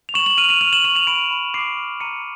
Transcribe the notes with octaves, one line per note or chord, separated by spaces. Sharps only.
F7
C#6 E7 F#7
E7 F#7
F6 D#7 F7
D#7 F7
F6 D#7 F7
E7 F#7
C#6 E7 F#7
D#7 F7
B5 D7 E7
B5
D6 C7 D7
F6
A#5 C#7 D#7